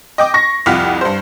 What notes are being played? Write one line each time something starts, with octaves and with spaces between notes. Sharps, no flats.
D#5 G5 D6
C#6 A#6
C2 F2 F4 F#5 F6 B6
G2 C5